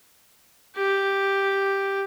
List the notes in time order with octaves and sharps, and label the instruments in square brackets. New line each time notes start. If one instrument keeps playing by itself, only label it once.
[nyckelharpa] G4